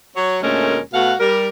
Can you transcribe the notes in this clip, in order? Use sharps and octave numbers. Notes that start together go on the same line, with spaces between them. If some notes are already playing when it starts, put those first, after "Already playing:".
F#3 C#5
D2 A#2 G#3 A3 C#4 A#4
B2 A3 F#4 F5 F#5
G3 A#4